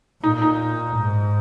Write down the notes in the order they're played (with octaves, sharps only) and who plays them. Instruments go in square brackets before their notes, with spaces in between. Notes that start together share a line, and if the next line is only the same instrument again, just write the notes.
[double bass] A#2 [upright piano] D#4
[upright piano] D#4
[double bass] G#2